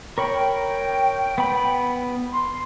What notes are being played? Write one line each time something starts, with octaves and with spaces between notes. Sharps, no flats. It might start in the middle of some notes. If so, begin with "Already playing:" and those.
A#4 C#5 G5 B5
B3 B5
C6